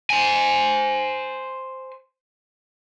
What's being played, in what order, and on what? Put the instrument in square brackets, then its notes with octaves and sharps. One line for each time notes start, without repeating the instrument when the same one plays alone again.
[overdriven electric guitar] C5 G#5